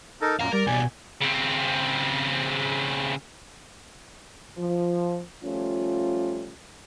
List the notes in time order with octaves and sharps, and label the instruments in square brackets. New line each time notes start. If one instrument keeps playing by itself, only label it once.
[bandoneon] D#4 A4 A#4
[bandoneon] F#2 A#2 [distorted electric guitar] F5 A#5
[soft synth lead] G3 [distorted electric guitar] A#4 [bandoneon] D5
[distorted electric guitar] B2 G3 [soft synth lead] G#5
[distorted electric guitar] C#3 C4
[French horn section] F3
F3 G3 A3 C#4 F4